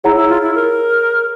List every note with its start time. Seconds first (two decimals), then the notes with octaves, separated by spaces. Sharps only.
0.04 E4 G#4 C#5 F#5 A#5
0.16 E4
0.29 F4
0.42 E4
0.55 A#4